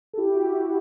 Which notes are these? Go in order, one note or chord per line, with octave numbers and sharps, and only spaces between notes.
A4
E4 G4
F#4
E4